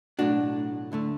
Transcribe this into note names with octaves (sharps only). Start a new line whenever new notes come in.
B1 A2 A3 D4 F#4
D2 D3 A3